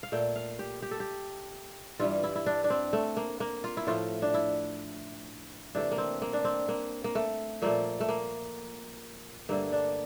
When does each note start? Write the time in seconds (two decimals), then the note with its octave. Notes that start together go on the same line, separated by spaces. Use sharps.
0.03 F5
0.12 A#2 A3 G5
0.36 F5
0.59 G4
0.82 G4
0.91 A4
1.00 G4
1.99 G2 E3 G3 F4
2.23 E4
2.35 E4
2.46 D4
2.64 D4
2.70 C4
2.93 A3
3.17 A#3
3.40 A#3
3.64 F4
3.77 E4
3.87 A2 F3 A3 F4
4.22 D4
4.34 E4
5.75 C3 E3 A3 D4
5.92 A#3
5.98 C4
6.22 A#3
6.33 D4
6.45 C4
6.68 A#3
7.04 A#3
7.15 A3
7.62 A#2 F3 A3 A#3
8.00 A3
8.09 A#3
9.49 G2 D3 A3 A#3
9.72 D4